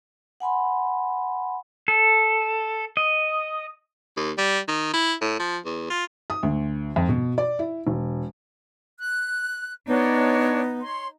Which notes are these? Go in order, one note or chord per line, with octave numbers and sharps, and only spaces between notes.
F#5 G#5 B5 C6
A4
D#5
D#2
G3
D#3
E4
A2
F3
E2
F4
D#6
D2
F2
B2
D5
E4
E1
F#6
B3 D4 D#4 C#5
C#5 C6